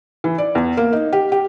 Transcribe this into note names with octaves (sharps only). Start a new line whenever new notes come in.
E3
D5
E2
A#3
D#4
G4
G4